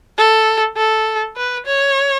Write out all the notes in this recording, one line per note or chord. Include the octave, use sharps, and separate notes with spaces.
A4
A4
B4
C#5